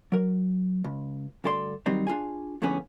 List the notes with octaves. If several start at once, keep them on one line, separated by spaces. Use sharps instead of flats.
F#3 A#4
C#2
D2 G2 A4 D5 C6
D#3 F#3 G3 C4 D#4
D4 F4 G#4 G#5
F2 A2 D3 B3 C#4 G#4